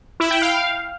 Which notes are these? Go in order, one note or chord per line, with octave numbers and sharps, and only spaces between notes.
E4
G5
F5